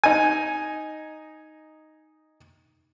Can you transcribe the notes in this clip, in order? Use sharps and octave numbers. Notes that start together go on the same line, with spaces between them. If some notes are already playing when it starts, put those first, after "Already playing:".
D#4 G#5